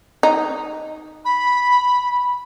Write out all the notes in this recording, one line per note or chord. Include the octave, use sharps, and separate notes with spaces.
D#4
B5